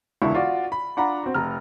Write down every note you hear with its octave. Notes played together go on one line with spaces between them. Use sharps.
E1 C#2 D3 E4 C#6
F4 F#4 D5
B5
D4 F4 F#5 A#5 B5
C4 F#4
F1 A#5 F6